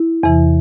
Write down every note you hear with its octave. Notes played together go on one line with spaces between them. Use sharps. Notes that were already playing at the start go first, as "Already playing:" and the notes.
Already playing: E4
E2 C3 E3